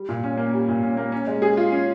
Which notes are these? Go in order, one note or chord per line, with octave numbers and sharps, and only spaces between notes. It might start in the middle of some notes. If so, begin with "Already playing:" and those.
Already playing: G3
A#2
C#4
A#3
G3
A#2
C#4
A#3
C#4
G#3
G#4
F4
C#4